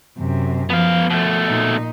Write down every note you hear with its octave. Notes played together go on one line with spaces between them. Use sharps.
F#2 C3
F3 B3 F5
B2 A3
A#2 D#4